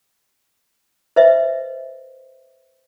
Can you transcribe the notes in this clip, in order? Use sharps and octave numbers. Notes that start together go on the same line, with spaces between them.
B4 C5 D#5 E5